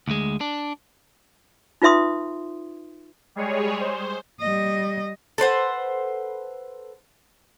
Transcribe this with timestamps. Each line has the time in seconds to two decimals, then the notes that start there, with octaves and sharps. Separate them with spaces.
0.08 D2 G#3
0.41 D4
1.82 D#4 F4 B4 E5 C6 D#6
3.35 G3 G#3 G#4 C#5
3.80 C5
4.41 G3 D#5
5.38 A4 B4 C5 F#5